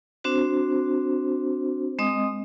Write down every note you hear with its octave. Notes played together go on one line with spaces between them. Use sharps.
C4 D4 F#4 C5
G#3 C4 D#5 D#6